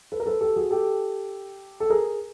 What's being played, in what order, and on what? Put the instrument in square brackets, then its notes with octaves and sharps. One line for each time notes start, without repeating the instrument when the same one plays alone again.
[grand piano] A4 B4
A#4
A4 B4
G4 A4
F#4 G#4
G4 A4
A4
G#4 A#4